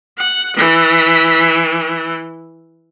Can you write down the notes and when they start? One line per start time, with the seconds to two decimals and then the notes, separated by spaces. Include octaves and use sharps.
0.18 F#5
0.56 E3